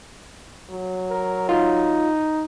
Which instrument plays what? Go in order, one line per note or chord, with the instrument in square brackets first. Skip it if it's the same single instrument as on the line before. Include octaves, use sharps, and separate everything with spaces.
[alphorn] F#3
[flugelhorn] A#4
[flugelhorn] D#4 [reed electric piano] F4